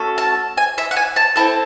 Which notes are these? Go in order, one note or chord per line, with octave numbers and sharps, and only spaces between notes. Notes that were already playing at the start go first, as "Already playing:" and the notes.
Already playing: A3 C#4 F#4 A4
A5
G#5
E5
F#5
G#5
A5
C4 E4 A4 A5